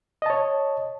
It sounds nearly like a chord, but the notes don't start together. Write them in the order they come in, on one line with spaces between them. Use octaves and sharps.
D#5 A5 C#5